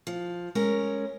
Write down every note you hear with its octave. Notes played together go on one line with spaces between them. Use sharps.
F3
G#3 C#4 A#4